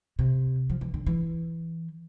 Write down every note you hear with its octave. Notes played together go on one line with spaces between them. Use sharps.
C3
F3
E3
D3
E3